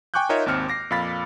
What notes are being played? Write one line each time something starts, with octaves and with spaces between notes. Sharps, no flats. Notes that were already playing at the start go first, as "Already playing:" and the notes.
G5 G#5 C#6 D6 F#6 G6
D#4 F4 A#4 C#5 D#5 E5
G#1 D#2 C4 F6 C#7
D6 A#6 C7
F2 A#2 F5 B5 A6 B6